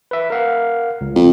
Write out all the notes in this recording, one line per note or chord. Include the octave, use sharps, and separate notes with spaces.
B4 E5
A#4 F5 F#5
C#2
F2